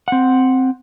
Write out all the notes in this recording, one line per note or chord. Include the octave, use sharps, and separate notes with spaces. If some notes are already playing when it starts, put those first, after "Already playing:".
C4 F#5